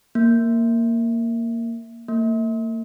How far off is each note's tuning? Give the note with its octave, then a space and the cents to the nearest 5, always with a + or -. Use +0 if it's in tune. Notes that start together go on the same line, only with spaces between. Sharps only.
A#3 -10
A#3 -40